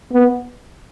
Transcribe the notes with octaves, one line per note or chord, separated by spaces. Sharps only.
B3